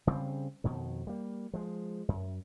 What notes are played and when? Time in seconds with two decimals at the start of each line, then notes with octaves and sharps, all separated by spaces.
0.07 C#3 G3 C4
0.64 F2 B2 D#3
1.07 G3 A#3
1.54 F3 G#3
2.08 F#2